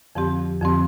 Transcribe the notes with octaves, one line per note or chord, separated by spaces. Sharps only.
F2 D3 F3 C4 G4
F2 D3 F3 C4 G4